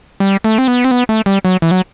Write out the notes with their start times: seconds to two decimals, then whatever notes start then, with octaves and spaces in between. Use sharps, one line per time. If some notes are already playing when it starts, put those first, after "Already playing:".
0.20 G3
0.44 A3
0.58 C4
0.68 B3
0.84 C4
0.91 B3
1.09 A3
1.26 G3
1.45 F#3
1.62 E3
1.71 F#3